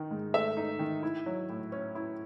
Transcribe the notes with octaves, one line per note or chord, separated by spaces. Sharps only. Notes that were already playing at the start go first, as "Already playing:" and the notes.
Already playing: D#3 D#4
G#2
A3 E5
D#4
D#3
E4
F#3
A2
C#4
E4